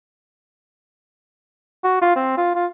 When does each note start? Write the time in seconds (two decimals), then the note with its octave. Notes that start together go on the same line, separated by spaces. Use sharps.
1.84 F#4
2.01 F4
2.16 C4
2.37 F4
2.55 F4